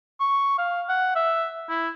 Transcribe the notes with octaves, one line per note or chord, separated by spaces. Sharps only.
C#6
F5
F#5
E5
E4